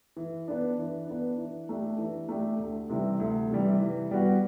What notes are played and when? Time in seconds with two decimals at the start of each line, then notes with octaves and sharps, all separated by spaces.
0.16 E3
0.48 B3 D4
0.78 E3
1.07 B3 D4
1.38 E3
1.69 A3 D4 G4
1.98 E3
2.29 A3 D4 G4
2.59 D2
2.90 C3 E3 G3
3.20 D2
3.50 C3 E3 G3
3.81 E3
4.11 G3 B3 F#4